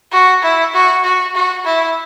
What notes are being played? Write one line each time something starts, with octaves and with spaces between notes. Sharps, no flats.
F#4
E4
F#4
F#4
F#4
E4